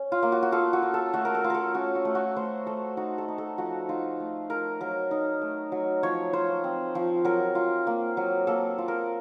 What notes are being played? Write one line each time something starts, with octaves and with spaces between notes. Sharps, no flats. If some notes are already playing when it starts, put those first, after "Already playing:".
Already playing: C#4
F4
A#3
F#4
F#4
F4 A4
F#4
F4
A4
A3 F#4
A#4
A4
F4
A4 A#4
C#4 F#4
F#4
A3
F#4
A3 C5
A3 A4
D#4 F#4
A4
D#4
A4
F3 F#4
D#4 F4
A3
F3 A#4
F#3 A#4
D#4
A3
F#3
F3 C#5
F4 C5
C4
F3
F#3 A#4
F4
A#3
F#3
A#3 A4
F4
A#4